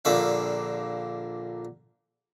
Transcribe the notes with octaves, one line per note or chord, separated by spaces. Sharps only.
A#1 A#2 D3 E5 F5